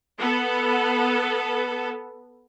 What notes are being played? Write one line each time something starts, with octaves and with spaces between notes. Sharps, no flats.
B3 A4